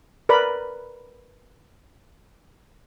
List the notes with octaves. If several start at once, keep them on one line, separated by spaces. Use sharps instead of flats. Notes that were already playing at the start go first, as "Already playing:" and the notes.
A#4 B4 D5 B5